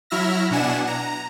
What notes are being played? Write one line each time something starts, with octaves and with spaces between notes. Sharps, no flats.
F#3 E4 E5 F6 A#6
B2 D4 F#5 G#5 E7
A#5